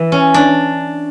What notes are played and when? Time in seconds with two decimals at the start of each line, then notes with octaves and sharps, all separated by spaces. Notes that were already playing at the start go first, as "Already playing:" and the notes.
Already playing: E3
0.12 C#4
0.34 D4